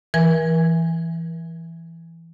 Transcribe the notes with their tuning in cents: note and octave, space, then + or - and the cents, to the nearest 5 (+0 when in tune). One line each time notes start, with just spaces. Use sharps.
E3 +10 A#4 +40 G#5 -15